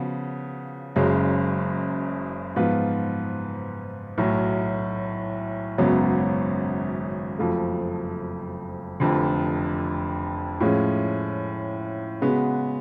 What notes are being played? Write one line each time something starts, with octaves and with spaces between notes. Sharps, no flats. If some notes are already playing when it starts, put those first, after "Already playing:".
Already playing: C#3 F3 B3 F#4
F#1 F#2 C#3 G#3
G#2 F3 B3 F4 B4
B1 A2 F#3
G#1 F#2 C#3 F#3 B3
F#1 F2 F3 A3
F1 F2 D3
A2 F3 G#3 C#4
C#3 G#3 B3 F#4 B4